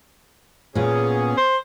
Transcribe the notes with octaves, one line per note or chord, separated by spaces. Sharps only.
A#2 B3 C#4 G#4
C5